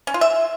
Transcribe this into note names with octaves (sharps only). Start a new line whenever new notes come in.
C#4
F4
E5